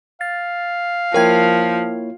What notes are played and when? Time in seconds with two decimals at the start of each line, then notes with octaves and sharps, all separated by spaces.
0.21 F5 A6
1.14 F3 A#3 E4 A#4 C#5 G5 G#6